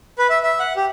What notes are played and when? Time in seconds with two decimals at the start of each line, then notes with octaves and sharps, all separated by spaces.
0.19 B4
0.30 E5
0.43 E5
0.59 F#5
0.76 G4